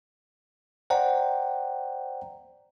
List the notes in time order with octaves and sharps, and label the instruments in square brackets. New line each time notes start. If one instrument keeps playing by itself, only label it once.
[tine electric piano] C5 D5 F#5 G5 A#5